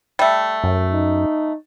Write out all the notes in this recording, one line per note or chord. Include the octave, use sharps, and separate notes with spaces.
G3 A3
F#2
D#4